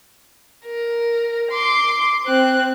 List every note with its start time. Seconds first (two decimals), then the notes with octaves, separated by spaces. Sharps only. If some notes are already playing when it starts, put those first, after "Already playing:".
0.66 A#4
1.51 C6 D6
2.26 C4 F#6